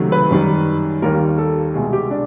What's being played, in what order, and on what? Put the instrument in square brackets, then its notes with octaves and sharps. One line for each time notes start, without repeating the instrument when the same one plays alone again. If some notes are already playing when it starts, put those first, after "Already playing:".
Already playing: [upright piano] C#2 C3 D#3 F#3 A3
B4
F#2 D#3 G3
D#2 D#3 G3 A#3 A#4
A4
C2 B2 G#3 G#4
G4
D4